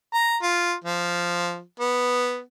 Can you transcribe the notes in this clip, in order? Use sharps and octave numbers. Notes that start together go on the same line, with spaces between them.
A#5
F4
F3
B3